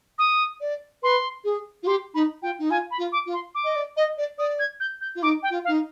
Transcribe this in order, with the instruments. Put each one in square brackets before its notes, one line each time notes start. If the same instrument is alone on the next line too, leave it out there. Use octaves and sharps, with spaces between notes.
[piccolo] D#6
[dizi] D5
[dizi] B4 [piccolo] C6
[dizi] G#4
F4
[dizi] G4 [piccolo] C6
[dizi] D#4 [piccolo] B5
[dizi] F4 [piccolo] G5
[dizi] D#4
[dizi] F4 [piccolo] G#5
[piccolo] B5
[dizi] F4
[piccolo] D6
[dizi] F4
[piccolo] C6
D6
[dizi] D#5
D5
D#5
D5
[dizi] D5 [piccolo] D#6
[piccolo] G#6
G6
G6
[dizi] F4
[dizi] D#4 [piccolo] D6
[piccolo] G5
[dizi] F4
[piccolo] F5
[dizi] D#4